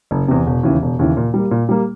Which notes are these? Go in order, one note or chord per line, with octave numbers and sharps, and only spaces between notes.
F#1
E2 C3
E1
D#2 C#3 E3
E1
D#2 C#3 E3
A#2
G3 A#3
A#2
G3 A#3